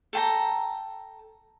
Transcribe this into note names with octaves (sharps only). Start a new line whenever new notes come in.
A4 G5 A#5